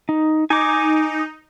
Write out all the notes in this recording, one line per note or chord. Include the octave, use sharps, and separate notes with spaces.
D#4
D#4 G#5 D6